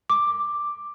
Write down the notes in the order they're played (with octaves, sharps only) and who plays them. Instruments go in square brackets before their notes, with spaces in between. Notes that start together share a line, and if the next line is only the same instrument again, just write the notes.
[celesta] D6